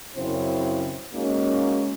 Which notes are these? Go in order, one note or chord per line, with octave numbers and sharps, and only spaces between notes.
F#2 C#3 C4 E4 C5
G#3 A#3 C#4 D#4 F#4